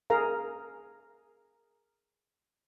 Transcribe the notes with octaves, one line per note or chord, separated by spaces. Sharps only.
G#4 A#4 F5 A#5